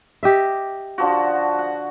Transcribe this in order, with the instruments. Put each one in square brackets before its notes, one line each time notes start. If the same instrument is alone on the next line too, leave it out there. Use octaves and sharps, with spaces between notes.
[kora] G4 D#5 E5
[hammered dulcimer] D3 F3 F#4
F#5